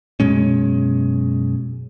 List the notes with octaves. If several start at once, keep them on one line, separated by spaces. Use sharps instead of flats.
F#2 B2 G#3 C#4